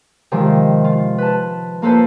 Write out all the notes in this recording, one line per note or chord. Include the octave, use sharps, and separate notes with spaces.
C3 D#3 F3 G#3
F4
B4 A5
A#3 F4 A4 B4 C5 A5